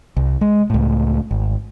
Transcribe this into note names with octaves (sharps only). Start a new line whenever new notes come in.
C2
G#3
C#2 A2
G#1